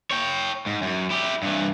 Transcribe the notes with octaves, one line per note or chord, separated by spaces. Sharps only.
C#5 G5
G#2
F#2
E4 G4
G2 E3